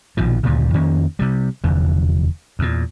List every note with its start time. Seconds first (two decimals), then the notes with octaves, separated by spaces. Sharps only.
0.17 A#1 B2 D#3 F3
0.43 D2 G2 A#2 C#3
0.74 F2 D#3 A#3 C#4
1.19 C3 G3
1.64 F1 E2 D3
2.59 E2 A#2